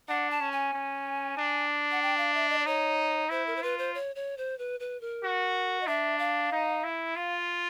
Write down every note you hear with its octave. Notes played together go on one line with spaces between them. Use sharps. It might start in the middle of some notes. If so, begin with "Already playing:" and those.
D4 F#5
A5
C#4
G#5
C#4
D4
F#5
G5
F5
E5
D#5
D5
D#4 C#5
E4 C5
A#4
C5
F4 B4
C5
C#5
C#5
C5
B4
B4
A#4
F#4
D#5
D4 E5
F5
D#4
E4
F4 F5